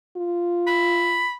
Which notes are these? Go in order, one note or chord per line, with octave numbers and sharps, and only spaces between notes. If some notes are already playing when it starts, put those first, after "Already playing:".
F4
B5